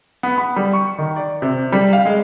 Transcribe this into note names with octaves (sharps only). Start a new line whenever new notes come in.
B3
B5
G3
C#6
D#3
D5
C3
G3
F5
G#3